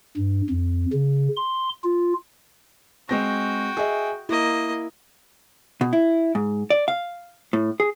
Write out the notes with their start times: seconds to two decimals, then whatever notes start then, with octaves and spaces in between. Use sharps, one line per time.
0.17 G2
0.50 F2
0.93 C#3
1.37 C6
1.84 F4
3.09 G#3 C4 F#4 G5 A#6
3.77 G#4 D#5 E5
4.29 A#3 E4 D#5
5.81 B2
5.93 E4
6.35 G#2
6.70 D5
6.88 F5
7.53 A2
7.80 G#4